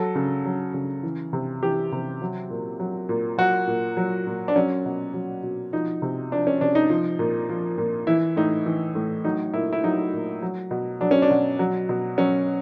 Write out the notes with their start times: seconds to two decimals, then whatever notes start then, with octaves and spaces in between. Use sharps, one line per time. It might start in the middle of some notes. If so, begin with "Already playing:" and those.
Already playing: F#3 A4
0.15 C#3
0.45 F#3
0.74 C#3
1.03 E3
1.33 C3
1.63 E3 G4
1.92 C3
2.22 F#3
2.50 A#2
2.80 F#3
3.09 A#2
3.38 F#3 F#4
3.67 A#2
3.97 F#3
4.27 A#2
4.48 D4
4.56 F#3 C#4
4.85 B2
5.14 F#3
5.43 B2
5.73 F3 D#4
6.02 C3
6.32 F3 D4
6.47 C#4
6.61 C3 D4
6.75 D#4
6.90 F3
7.19 A#2
7.49 F3
7.78 A#2
8.07 E3 E4
8.36 A2 D#4
8.66 E3
8.95 A2
9.25 F#3 D#4
9.54 A#2 E4
9.73 E4
9.84 F#3 D#4
10.13 A#2
10.42 F#3
10.71 B2
11.01 F#3 D4
11.11 C#4
11.22 D4
11.30 B2
11.59 F#3
11.89 B2
12.18 F#3 C#4